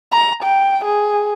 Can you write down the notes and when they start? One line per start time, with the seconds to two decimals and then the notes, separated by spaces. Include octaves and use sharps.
0.12 A#5
0.43 G5
0.85 G#4